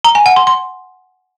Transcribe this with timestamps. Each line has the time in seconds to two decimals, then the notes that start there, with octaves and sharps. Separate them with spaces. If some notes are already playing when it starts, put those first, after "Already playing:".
0.04 A#5
0.15 G#5
0.26 F#5
0.36 C6
0.47 C6